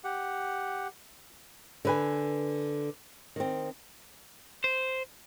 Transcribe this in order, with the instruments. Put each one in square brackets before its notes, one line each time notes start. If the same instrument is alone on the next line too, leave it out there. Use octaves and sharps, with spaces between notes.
[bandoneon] G4 F#5
[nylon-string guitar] D3 B4 G#5
D#3 C4
[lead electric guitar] C5